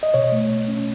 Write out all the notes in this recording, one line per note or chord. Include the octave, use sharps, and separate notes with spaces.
D#5
B2 C#5
A3
B2
C#4